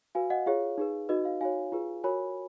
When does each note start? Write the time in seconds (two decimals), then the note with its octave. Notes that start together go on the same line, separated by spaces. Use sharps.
0.15 F#4 B4 F5 G#5
0.30 D#5 F#5
0.46 F4 G#4 C#5 F5
0.78 D#4 G#4 B4
1.09 D#4 F#4 B4 D#5
1.25 F5
1.41 D#4 F#4 C#5 F5 G#5
1.72 F4 G#4 B4
2.04 F#4 A#4 C#5 G#5 B5